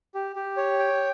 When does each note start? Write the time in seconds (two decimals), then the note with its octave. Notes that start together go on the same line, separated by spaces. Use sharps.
0.15 G4
0.36 G4
0.57 C#5
0.79 G5